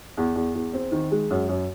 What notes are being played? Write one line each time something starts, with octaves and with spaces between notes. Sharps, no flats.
E2
E2
E2
C4
D#3
G#3
F#2
F#2